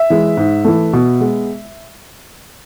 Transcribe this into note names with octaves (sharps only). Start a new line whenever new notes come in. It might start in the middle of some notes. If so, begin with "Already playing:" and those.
Already playing: E5
E3 G#3
G#2
E3 A3
B2
G#3 B3